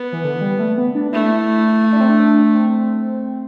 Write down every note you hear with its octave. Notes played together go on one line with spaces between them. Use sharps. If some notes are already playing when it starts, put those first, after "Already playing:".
Already playing: B3
E3
D3
G3
A3
B3
D4
A3 E4
E4
D4
C4
D4
C4